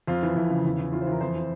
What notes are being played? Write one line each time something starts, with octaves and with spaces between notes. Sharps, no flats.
F2 F4
E3
F2 E4
C#3
E2
E2
E3 F4
C5
E3 A#4
F2 C5
F3